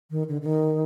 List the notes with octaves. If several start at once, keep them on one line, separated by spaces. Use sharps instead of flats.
D#3
D3
D3
D#3